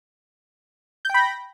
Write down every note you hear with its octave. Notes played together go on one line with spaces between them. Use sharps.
G5 B5 G6 A#6